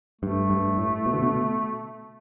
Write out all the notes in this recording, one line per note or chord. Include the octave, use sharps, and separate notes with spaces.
G2 A3
G2
A2
B2
D3
B2